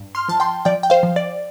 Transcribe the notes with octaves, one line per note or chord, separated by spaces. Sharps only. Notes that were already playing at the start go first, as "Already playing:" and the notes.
Already playing: G2
C6 F6
F3 A5
G5 C6
F3 D5 G5
G5
C5 F5
F3
D5